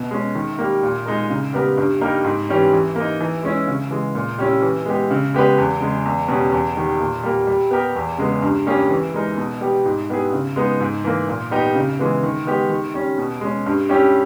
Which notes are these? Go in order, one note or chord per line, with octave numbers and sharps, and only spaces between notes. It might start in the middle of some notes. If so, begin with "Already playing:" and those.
Already playing: B2
G#3 C#4
D#3
G3 A#3
A#2
G#3 D#4 A#4
C#3
G3 B3 G4 A#4
G2
G3 A#3 D#4 A#4
G#2
E3 G3 C#4
E3
A#3 D#4
E3
G#3 C#4 E4
C#3
E3 G#3
A#2
G3 C#4 E4
E3
G#3 B3 G4
C#3
G#3 B3 G4 B4
E2
C#3 G#3
E2
B2 G3 C#4
E2
D#3 G3
A#2
G3 A#3
G3
B3 G4 A#4
E2
C#3 G#3 B3
G2
G3 A#3 C#4 G#4
E3
G#3 D#4 A#4
B2
G3 B3 G4
G#2
G3 B3 E4 G#4
C#3
G#3 B3 D#4
G#2
E3 A#3
A#2
G3 B3 D#4 G4
C#3
E3 G#3 B3
D#3
G#3 B3 G4
D#3
G3 C#4
B2
G#3 C#4
G2
G3 C#4 E4 G4